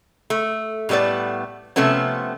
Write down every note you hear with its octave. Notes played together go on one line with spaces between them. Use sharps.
A3
A2 G3 A3 B3 D5
C3 F3 A3 B3 C#4